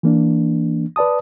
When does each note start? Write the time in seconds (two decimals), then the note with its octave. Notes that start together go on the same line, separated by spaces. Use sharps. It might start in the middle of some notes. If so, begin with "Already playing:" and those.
0.03 E3 A#3 D4
0.96 B4 D5 A5 D#6